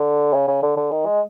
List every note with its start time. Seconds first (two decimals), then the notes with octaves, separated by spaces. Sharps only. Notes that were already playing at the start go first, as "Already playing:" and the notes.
Already playing: D3
0.34 C#3
0.48 C#3
0.63 D3
0.77 D3
0.91 D#3
1.06 G#3